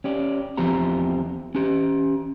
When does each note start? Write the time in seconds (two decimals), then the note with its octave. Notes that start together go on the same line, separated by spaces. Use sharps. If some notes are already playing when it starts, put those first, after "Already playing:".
0.04 C#4 G4 D5
0.57 E2 F3 C4 G4 A#5
1.55 C#4 G4